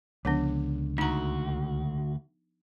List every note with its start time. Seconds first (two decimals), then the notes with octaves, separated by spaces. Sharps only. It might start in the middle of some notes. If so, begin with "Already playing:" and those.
0.25 C#2 D3 F3 B3 D4
0.98 D2 D#4 F#4 A#5